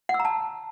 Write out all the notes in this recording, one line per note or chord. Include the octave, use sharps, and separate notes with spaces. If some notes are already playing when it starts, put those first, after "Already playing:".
F#5
E6
A#5
A5